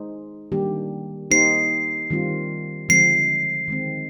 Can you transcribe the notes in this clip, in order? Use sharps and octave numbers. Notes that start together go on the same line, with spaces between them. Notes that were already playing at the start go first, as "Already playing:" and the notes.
Already playing: G#3 D#4 G#4 C5
D#3 G3 A#3 D4 G4
A#3 D#4 G4 C5 C7
D#3 G3 C4 F4
D3 F3 G#3 C4 C7
D#3 G#3 C4